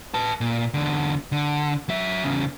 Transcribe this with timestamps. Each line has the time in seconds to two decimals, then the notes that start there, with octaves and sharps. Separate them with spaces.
0.14 B4 A5
0.41 A#2
0.74 E2 D3
1.32 D3
1.89 F#3 E5
2.24 E2 C#3